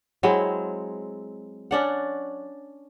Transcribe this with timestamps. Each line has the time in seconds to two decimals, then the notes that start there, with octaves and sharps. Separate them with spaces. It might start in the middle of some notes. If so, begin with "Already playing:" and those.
0.23 F#3 G#3 C4 E4
1.71 C#4 D4 F#5